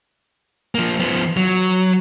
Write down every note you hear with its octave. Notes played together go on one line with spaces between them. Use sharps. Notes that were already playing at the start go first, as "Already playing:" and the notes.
F3 A#3
F3 B3
F#3